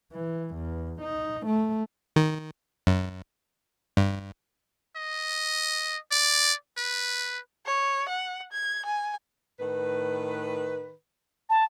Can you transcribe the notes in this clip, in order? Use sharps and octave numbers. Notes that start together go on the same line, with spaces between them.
E3
E2
D#4
A3
D#3
F#2
G2
D#5
D5
B4
C#5
F#5
G#6
G#5
A2 D#3 B4
A5